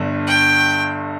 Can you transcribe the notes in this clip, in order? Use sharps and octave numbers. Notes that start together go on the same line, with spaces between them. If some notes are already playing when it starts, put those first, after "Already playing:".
Already playing: G1 G2 D3
G5